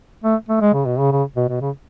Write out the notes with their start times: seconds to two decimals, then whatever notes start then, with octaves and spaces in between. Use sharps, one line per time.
0.24 A3
0.49 A3
0.61 G#3
0.74 C#3
0.86 B2
0.99 C#3
1.12 C#3
1.36 B2
1.49 B2
1.61 C#3